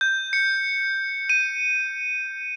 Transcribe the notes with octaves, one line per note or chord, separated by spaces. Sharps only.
G6
C#7
D#7